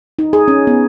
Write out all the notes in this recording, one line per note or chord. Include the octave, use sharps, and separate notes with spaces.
D#4
G#4
C#4
B3